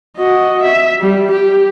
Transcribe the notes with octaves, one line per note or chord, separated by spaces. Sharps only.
F#4 D#5
E5
G3
G4